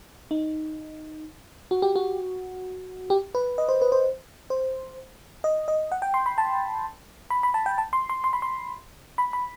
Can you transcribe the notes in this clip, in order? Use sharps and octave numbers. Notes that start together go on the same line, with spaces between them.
D#4
F#4
G4
F#4
G4
B4
D#5
C5
B4
C5
C5
D#5
D#5
F#5
G5
C6
B5
A5
B5
B5
A5
G5
A5
C6
C6
C6
B5
C6
B5
B5